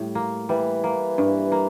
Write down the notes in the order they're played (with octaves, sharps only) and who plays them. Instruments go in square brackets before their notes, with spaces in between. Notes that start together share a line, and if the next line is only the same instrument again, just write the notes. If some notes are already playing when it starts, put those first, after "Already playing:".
Already playing: [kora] A2 G3
A#3
[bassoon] E3 [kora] G3
[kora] A#3
G2
A#3